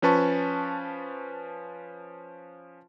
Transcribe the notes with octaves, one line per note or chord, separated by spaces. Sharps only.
F3 C#4 B4 A5 C#6